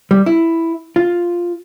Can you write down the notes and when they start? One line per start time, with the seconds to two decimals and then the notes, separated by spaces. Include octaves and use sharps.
0.11 G3
0.26 E4
0.96 F4